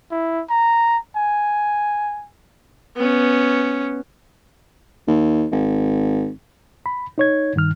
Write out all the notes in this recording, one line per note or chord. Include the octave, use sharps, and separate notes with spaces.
E4
A#5
G#5
B3 C#4
D#2
G#1
B5
D#4 C#5 G#6
G2 D#3 F6